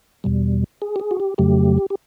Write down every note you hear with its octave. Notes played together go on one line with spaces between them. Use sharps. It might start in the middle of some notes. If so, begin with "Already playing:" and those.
E2 B2 G3
G#4
G4
G#4
F#4
G4
F2 C#3 F#3 A3 G4
G4